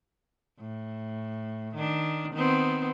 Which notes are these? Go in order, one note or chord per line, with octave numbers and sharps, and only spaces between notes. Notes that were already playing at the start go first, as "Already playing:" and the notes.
A2
D#3 D4
D#3 B3 C4